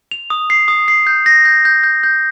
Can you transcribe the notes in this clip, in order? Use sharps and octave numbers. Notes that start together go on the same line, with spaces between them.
F7
D#6
C7
D#6
C7
G6
A#6
G6
G6
G6
G6